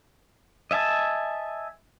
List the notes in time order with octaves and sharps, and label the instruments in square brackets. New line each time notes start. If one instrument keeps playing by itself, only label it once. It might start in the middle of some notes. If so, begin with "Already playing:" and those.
[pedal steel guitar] D#5 E5 G#5 A5